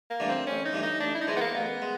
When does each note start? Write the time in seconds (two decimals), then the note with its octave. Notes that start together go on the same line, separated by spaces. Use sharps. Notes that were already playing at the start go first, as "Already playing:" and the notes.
0.10 A#3
0.20 G2 E3 A3 D4
0.29 C4
0.47 A1 C#4
0.65 D#4
0.73 G2 E3 A3 D4
0.83 D#4
1.00 A1 D4
1.15 E4
1.21 D#4
1.27 G#2 E3 G#3 E4
1.37 B3
1.41 A#3
1.55 A1 B3
1.82 G#3